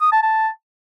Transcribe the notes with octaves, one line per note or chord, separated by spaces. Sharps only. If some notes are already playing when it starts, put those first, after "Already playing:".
D#6
A5
A5